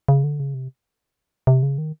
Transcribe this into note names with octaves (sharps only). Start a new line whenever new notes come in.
C#3
D3
C#3
C3
C3
C#3
D#3